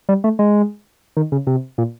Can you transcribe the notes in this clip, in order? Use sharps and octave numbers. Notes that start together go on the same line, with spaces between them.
G3
A3
G#3
D#3
C#3
C3
A#2